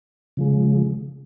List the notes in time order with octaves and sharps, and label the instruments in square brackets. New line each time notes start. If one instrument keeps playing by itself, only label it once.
[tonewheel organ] C#3 F3 G#3